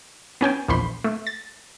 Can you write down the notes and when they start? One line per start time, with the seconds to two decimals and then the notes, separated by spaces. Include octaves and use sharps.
0.41 B3 C#4 G5 G#5
0.68 A#1 E2 C5 B5 C6
1.04 A3
1.27 A6